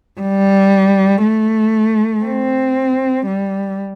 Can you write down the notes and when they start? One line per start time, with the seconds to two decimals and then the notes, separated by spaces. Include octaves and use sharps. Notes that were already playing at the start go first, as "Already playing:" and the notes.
0.21 G3
1.23 A3
2.25 C4
3.26 G3